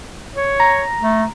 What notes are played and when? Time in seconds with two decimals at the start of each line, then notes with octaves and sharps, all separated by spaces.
0.35 C#5
0.60 A#5
1.02 A3